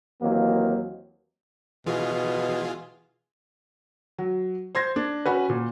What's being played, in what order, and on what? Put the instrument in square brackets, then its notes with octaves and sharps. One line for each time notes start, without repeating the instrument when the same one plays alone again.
[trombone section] D#2 E3 F#3 A#3 C4
[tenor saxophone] B2 [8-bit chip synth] E3 F4 G#4
[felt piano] F#3
C5 C6 G#6 A#6
D4
C#4 F#4 B4
A#2